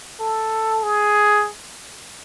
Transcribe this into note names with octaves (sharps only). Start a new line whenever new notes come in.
A4
G#4